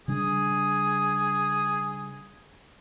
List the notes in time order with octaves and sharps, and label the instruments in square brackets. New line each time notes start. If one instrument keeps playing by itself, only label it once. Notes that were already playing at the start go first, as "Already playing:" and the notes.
[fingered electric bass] C#3 G3 D4 [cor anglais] G#4